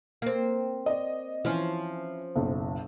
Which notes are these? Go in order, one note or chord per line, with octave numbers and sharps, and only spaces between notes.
A#3 C4
D5 D#5
E3 F3 C#4
F#1 B1